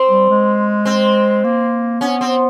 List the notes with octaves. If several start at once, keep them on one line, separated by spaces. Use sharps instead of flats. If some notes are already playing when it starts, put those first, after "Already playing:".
Already playing: C4
G3
G#3
C4
A#3
B3 C#4
C4